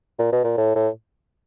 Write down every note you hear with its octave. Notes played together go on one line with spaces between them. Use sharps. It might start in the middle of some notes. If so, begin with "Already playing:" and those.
A#2
B2
A#2
A2
A2